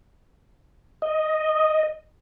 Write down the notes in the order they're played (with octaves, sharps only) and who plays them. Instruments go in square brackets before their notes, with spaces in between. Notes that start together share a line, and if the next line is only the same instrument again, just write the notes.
[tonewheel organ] D#5